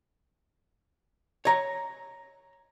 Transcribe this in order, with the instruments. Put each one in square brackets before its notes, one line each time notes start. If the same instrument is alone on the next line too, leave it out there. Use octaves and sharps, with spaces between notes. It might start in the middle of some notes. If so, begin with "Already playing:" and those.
[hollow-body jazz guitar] C#5 A#5